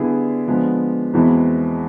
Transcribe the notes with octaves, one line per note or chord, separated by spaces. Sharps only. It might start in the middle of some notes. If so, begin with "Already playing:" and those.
Already playing: D3 G3 B3 E4 G#4
D3 F3 G#3 B3
E2 B2 G#3 C4 E4